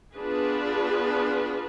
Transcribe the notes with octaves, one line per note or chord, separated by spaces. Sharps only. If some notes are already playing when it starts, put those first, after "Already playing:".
B3 D4 F4 G#4 B4